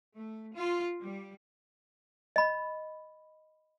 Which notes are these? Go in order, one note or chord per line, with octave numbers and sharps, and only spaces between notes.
A3
F4
G3
D#5 B5